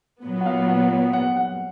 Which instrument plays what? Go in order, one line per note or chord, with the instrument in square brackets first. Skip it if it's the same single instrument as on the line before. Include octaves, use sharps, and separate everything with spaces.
[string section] A#2 F#3 B3
[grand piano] F#5
F5
F#5
F#5
F#5